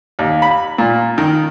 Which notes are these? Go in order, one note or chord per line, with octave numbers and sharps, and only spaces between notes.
D#2
B5
A#2
D#3